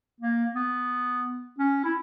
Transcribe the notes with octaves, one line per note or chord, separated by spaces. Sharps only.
A#3
B3
C#4
E4